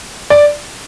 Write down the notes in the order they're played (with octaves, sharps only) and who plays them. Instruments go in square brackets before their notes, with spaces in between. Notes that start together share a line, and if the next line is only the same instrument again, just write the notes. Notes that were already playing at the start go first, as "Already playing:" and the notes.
[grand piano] D5